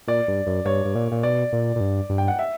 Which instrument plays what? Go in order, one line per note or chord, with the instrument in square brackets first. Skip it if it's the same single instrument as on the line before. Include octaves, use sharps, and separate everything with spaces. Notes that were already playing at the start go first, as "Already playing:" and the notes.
[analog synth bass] A#2 [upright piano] D5
[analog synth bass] G2
F#2
[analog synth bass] G2 [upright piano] C#5
[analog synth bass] G2
A#2
A#2
[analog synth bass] B2 [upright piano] D5
[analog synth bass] A#2
A#2
G2
G2
[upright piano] G5
F#5
E5